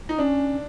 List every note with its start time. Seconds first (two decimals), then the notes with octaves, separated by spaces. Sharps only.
0.09 D#4
0.18 C#4 D4